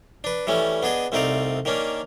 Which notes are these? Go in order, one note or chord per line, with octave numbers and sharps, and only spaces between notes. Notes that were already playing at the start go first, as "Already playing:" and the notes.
D4 B4
E3 G3 A3 C#4
B3 D4 G#4 D#5
C2 A3 C4 D#4 D5 F5
D#3 A#3 C#4 D4